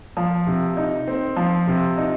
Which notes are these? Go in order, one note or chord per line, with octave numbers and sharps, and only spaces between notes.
F3
C3
D#4
C4
F3
C3
D#4